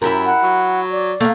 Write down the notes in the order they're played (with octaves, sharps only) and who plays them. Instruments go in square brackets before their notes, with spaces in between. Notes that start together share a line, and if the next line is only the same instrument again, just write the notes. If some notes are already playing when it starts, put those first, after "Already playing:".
[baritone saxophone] F#2 [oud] E4 G4 A#4
[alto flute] F#5
[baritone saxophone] F#3
[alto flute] D5
[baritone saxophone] A3 [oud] A#3 F5